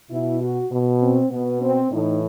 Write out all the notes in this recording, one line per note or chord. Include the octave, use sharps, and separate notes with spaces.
B2 E4
F#4
B2
C4
B2 B3
C4
A2 E3 D#4